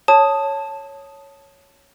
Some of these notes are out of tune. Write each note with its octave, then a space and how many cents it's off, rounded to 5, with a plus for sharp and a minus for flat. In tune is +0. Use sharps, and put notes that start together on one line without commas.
C#5 +0 A5 +0 D#6 +0